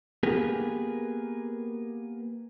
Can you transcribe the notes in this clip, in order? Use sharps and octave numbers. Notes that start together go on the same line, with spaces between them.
A#3 B3 G4 G#4 A#4 B4